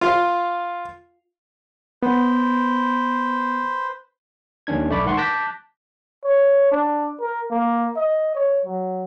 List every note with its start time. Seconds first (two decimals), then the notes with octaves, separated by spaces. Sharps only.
0.01 F4 F5
2.03 B3 B4 C5
4.67 D#2 D#3 C#4 D4 G#6
4.89 B1 A3 D5 B5 D6
5.05 G#2 D#3 F#5 C6 C#6
5.17 A5 D6 F#6 G6 A#6 B6
6.24 C#5
6.72 D4
7.21 A#4
7.51 A#3
7.96 D#5
8.35 C#5
8.65 F#3